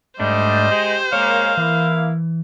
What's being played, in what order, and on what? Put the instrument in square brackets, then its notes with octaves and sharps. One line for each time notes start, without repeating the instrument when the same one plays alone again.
[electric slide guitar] G#2 A3 D4 [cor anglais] G3 [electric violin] C5 [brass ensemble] D#5
[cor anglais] G#3 [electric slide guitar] G4
[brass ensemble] G#3 A#3 [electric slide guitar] A#4 C#5 [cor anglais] F5
[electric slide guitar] E3 [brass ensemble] A#3 E4